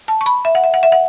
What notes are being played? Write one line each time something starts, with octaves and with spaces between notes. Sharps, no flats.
A5
C#6
B5
E5
F#5
E5
F#5
E5
F#5